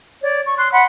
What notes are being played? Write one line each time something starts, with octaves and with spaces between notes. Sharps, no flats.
C#5 D5
C#6
C6 F#6
F#5 B5 C6